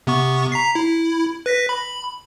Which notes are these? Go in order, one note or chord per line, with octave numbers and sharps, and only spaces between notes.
C3 B3 C#6
A#5 B6 C7
E4
B4 A#6 B6
B5